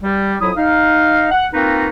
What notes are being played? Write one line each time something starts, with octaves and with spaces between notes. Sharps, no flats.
G3
F2 F#3 E4 D#6
D#4 F5
F#5
A#3 C4 D#4 F4 F#4 B4